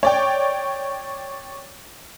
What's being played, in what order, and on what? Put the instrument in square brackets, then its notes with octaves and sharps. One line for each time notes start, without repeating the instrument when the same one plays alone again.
[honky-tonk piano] C#5 D5 G5